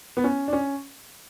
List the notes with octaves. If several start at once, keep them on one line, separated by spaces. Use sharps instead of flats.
B3
C#4
D4
C#4